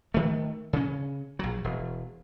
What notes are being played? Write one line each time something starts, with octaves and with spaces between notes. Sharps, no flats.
D#3 A3
C#3 C#4
A#1 F#3
E1